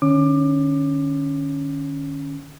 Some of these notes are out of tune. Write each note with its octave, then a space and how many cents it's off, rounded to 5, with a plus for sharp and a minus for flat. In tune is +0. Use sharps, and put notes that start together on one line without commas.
D#3 -45 C#4 +0 D6 +25